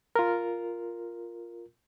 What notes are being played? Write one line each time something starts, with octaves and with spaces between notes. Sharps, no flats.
F4 A#4